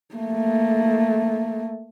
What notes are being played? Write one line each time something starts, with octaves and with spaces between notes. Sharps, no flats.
A3 A#3